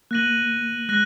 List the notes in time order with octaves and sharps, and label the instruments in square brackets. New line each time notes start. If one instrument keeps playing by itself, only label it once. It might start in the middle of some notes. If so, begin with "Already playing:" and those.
[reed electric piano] A#3 [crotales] F#6 A#6 D#7 F#7
[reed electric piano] G#3 [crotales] F#6 A#6